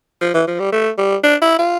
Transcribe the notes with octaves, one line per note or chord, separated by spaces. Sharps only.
F3
E3
F3
G3
A3
G3
D4
E4
F4